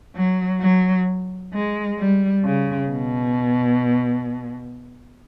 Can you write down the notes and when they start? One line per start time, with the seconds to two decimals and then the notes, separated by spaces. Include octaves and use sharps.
0.16 F#3
0.61 F#3
1.53 G#3
1.99 G3
2.44 C#3
2.90 B2